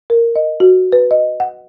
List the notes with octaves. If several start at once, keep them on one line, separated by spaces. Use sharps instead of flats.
A#4
D#5
F#4
B4
D#5
F#5